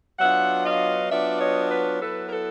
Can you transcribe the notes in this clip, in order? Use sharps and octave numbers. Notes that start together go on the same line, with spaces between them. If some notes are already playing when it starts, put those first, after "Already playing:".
F#3 B3 D4 F4 E5 F#5
D#5 F5
F#3 B3 D4 F4 D5 E5
C#5 D#5
B4 C#5
F#3 B3 E4 A4 B4
A#4
A4 B4